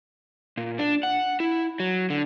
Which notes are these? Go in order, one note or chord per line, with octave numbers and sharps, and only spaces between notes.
A#2
D4
F#5
E4
F#3
D3